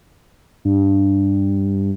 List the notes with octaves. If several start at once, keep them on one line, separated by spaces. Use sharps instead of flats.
G2